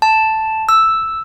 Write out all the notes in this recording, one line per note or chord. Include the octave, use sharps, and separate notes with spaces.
A5
E6